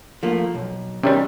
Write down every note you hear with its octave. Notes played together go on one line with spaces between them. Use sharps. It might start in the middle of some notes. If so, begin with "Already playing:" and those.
F3 A3 A#3
B1
C3 D#3 G3 C#4